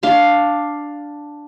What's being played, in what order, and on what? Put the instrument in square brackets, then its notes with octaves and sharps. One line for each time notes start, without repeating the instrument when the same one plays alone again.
[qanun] D4 F5 C6